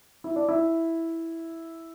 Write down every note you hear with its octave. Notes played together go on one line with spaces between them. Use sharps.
E4
D4
E4